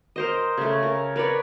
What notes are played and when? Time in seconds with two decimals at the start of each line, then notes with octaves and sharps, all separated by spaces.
0.16 A#4 C5 D#5
0.58 C#3 A3
0.83 A#4
1.16 A#4 B4 C#5 D5